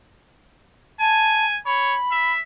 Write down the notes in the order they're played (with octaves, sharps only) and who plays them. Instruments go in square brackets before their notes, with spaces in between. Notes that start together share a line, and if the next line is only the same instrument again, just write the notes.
[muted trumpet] G#5 [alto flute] A5
[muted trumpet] C#5 [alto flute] B5
[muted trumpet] E5